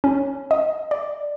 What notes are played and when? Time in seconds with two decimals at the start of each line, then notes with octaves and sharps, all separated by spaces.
0.04 C#4
0.51 D#5
0.91 D5